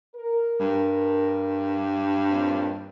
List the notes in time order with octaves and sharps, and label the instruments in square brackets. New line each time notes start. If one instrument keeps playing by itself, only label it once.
[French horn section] A#4
[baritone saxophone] G2
[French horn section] D#2 A#2 C4